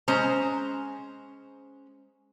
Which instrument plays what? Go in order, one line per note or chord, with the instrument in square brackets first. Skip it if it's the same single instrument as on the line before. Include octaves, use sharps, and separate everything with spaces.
[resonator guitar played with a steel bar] G#3 C#4 C5 A#5